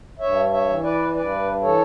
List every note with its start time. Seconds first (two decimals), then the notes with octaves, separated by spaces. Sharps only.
0.19 G2 C#5 E5
0.51 C#5 E5
0.67 E3
0.82 B4 D5
1.14 G2 B4 D5
1.61 E3 A4 C#5